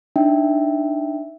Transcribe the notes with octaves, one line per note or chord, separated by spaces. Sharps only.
D4 D#4 E5 G5